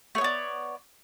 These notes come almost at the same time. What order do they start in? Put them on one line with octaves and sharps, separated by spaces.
A3 C#5 B3 D5